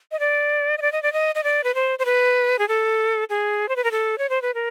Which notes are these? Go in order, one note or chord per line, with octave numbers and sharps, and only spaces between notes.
D#5
D5
D#5
D5
D#5
D5
D#5
D#5
D5
B4
C5
C5
B4
G#4
A4
G#4
C5
B4
A#4
A4
C#5
C5
B4
A#4